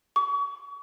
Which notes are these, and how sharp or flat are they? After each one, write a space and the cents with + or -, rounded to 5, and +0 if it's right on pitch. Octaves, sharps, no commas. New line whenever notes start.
C#6 +35